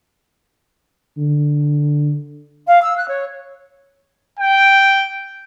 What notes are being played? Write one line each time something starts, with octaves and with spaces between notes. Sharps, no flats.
D3
F5
E6
F#6
C#5
G5